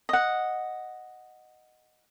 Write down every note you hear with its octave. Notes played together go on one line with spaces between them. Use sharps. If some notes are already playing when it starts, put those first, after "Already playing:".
D#5 F#5